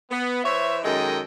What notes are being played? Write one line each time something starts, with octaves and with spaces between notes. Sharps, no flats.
B3
E3 C5 C#5 E5
F#2 D#3 G#3 A4 D#5 G5